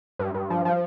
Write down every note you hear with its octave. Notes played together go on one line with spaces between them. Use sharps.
G2
G2
F3
F3